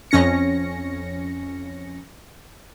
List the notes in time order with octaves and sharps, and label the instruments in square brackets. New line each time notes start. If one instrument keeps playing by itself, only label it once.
[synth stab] F2 C#4 A#6 C#7